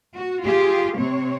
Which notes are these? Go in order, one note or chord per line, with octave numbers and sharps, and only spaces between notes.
F#4
F4 G4 G#4
C3 C4 C#5